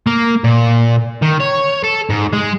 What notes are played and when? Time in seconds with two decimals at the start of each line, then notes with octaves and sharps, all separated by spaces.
0.07 A#3
0.44 A#2
1.22 D#3
1.40 C#5
1.84 A4
2.10 G#2
2.33 G#3